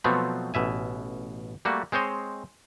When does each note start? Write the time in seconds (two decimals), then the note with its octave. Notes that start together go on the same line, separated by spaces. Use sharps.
0.04 B2 F3 F#3 A3 B3 C4
0.54 A1 B2 E5 G#5
1.65 G3 A3 A#3 F#4
1.92 G#3 C4 C5 C#5 D#5